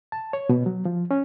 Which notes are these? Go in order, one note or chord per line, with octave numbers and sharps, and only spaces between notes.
A5
C#5
B2
F#3
F3
C#4